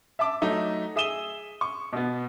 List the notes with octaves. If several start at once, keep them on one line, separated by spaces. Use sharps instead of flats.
E5 A5 D6
F#3 A3 D#4 D#5 E5
G#4 E5 D#6 D#7 E7 G7
C#6
B2 B3